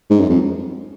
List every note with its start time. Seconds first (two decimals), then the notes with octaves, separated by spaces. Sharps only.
0.10 G#2
0.20 F#2
0.29 F2